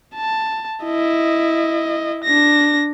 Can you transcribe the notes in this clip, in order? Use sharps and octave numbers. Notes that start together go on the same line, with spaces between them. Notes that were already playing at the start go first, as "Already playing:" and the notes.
A5
E4 D#5
D4 A#6